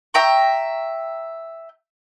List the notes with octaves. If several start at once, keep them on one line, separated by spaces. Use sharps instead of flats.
E5 G5 A#5 C#6